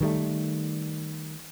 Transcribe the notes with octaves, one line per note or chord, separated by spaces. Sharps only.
D#3 G3 A3